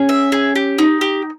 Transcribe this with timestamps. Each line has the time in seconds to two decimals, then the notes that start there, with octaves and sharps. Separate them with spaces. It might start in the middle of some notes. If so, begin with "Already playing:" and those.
Already playing: C#4 G#4
0.09 E5
0.32 G#4
0.55 G4
0.78 D#4
1.01 G4